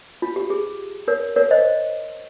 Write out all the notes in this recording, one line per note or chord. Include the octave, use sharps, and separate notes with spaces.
F4
G4
G#4
A#4 C#5
A#4 C#5
C5 D#5